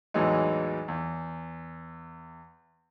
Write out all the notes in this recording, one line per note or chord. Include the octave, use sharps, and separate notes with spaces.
E2 A2 E3 F#3 G#3 D#4
E2